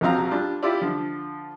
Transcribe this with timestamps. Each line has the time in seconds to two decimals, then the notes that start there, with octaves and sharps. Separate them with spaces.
0.01 A#1 F3 F#3 C4 F5 A#5
0.31 G3 D4 F4
0.63 E4 F4 G4 D5
0.82 D3 F3